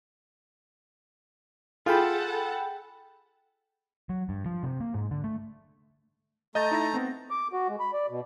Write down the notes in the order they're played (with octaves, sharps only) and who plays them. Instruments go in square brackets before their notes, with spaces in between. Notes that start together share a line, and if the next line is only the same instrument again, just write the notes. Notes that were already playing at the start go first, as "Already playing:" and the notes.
[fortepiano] F4 [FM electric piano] G#4 G5 B5 [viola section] A4 F#5 A5
[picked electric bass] F#3
G2
F3
C3
A#3
G#2
D3
A3
[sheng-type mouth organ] A3 A#5 [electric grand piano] D#5 G6 A6
[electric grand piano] D#4 E4 A#6
B3 C4
[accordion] D6
F#4
G#3
B5
D5
B2